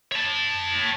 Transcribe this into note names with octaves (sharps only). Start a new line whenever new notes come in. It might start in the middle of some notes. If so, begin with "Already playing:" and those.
C#5 A5